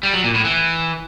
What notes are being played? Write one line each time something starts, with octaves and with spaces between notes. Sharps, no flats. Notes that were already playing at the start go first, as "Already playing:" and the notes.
G3
F#3
A#2
A2
E3